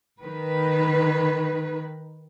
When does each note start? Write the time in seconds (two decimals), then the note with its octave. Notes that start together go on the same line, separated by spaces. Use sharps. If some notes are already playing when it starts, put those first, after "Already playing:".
0.21 D#3 B4